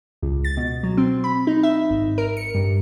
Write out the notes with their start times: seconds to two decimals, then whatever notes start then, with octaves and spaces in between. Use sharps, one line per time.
0.23 C#2
0.44 A6
0.57 B2
0.83 F#3
0.97 C4
1.24 B5
1.47 D#4
1.63 E5
1.90 G#1
2.18 A#4
2.37 C#7
2.55 G2